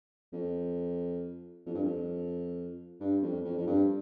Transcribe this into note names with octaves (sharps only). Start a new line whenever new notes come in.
F2
F2
G2
F2
G2
F2
F2
F2
G2